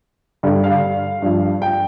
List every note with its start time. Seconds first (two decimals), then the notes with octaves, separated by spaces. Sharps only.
0.43 G2 D3 G3
0.64 F5
1.22 G2 F3
1.62 G5